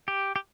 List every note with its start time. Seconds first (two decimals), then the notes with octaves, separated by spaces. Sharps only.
0.08 G4
0.36 G4